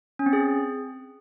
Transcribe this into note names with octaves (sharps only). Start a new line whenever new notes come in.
C#4
C4
G#4